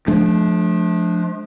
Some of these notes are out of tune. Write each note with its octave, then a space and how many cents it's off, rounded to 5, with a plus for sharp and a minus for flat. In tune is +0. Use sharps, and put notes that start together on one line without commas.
F3 +10 A3 -40 D4 +0